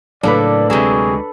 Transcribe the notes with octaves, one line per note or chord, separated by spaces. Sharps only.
A2 C#3 F#3 A#3 D4 A4 B4 D5
D2 C3 F#3 G#3 G#4